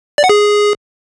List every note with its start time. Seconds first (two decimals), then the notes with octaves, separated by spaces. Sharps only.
0.18 D5
0.24 F#5
0.29 G#4